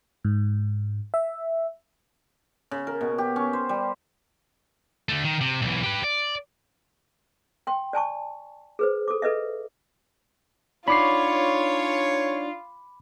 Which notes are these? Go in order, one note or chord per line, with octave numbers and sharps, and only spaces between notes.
G#2
E5
C#3
A#4
B2
G4
C#4
C5
G3
D3 A3
D#3
C3
B1 E3
G4 B4
D5
G5 C6
D5 G#5 A5 C#6
G#4 B4 C5
A4 D6
A4 B4 D#5 E5
D4 D#4 F4 C#5 F#5 B5 D6 C7